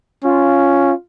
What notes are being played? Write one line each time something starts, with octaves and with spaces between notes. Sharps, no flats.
C#4 F4